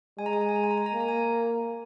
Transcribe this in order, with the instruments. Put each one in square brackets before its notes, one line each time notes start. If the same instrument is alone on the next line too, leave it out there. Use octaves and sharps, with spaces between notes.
[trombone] G#3 [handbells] G#5
[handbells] A#5
G#5
A#5
G#5
A#5
G#5
A#5
G#5
A#5
[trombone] A#3 [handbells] G#5
[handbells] A#5
G#5